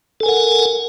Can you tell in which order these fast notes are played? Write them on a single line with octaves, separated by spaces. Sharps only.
A4 G#5 A#4 F#5